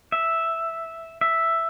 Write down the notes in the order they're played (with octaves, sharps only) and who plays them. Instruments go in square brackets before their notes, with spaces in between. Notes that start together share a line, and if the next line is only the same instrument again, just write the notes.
[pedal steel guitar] E5
E5